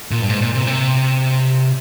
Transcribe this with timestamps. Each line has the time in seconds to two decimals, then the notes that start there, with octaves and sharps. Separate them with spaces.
0.11 A#2
0.22 G2
0.30 G#2
0.42 A#2
0.55 C3
0.63 A#2
0.67 C3